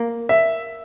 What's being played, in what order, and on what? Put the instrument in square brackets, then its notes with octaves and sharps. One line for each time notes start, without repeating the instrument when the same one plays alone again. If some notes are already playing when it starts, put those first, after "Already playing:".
Already playing: [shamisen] A#3
[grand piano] E5